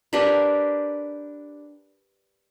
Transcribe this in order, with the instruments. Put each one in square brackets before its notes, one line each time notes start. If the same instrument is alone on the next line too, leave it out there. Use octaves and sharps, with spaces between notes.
[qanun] D4 G4 A#4 B4